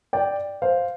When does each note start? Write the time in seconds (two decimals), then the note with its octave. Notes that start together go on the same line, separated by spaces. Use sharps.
0.13 D5 G5
0.62 C5 F5